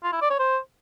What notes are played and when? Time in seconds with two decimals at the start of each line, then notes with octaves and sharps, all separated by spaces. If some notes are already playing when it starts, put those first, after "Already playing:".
0.03 F4
0.12 E4
0.21 D5
0.30 C#5
0.39 C5